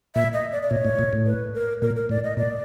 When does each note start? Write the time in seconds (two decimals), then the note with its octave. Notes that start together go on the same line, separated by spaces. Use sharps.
0.15 A#2 E5
0.33 D#5
0.52 D5
0.63 D5
0.70 A#2 C#5
0.85 A2
0.99 A#2
1.13 A2
1.26 B4
1.54 A#4
1.82 A#2 A#4
1.96 A#4
2.09 A2 D5
2.24 D#5
2.37 A#2 D5